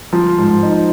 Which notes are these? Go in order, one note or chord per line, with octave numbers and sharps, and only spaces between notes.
F3
G#2
D#4